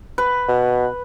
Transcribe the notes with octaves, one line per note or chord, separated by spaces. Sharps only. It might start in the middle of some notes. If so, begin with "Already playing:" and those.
B4
B2